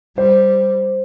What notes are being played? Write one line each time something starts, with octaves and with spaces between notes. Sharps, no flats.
G3 C5